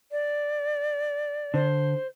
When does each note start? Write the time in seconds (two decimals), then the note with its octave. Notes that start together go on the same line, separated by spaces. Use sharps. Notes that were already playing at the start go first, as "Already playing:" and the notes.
0.12 D5
1.54 D3 C5